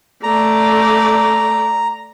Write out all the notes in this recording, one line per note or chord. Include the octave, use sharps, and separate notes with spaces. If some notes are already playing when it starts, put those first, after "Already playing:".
A3 D5 A#5